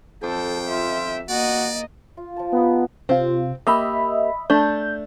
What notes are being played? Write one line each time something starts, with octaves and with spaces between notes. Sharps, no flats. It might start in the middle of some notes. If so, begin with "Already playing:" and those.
F2 A4 G5
F4 E5
A#3 F#4 D5 D#5
F4
F3 A5
B3 D#4 G4
G#3
C3 C4 F4
A#3 G4 D#5 E5 B5
A3 D4 G6